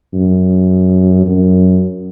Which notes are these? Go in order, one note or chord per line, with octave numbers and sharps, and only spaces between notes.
F#2
F#2